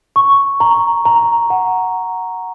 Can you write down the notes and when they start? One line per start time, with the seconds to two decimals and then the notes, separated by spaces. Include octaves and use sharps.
0.16 C#6
0.60 A#5
1.05 A#5
1.50 F#5